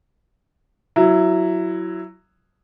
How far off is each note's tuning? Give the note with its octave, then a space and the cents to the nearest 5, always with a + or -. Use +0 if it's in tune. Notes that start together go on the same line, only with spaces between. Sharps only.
F#3 +0 E4 +10